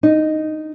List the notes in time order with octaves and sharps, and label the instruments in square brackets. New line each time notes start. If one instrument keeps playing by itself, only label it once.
[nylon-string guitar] D#4